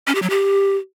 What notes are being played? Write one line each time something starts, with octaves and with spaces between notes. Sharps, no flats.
C#4
G4
F#3
G4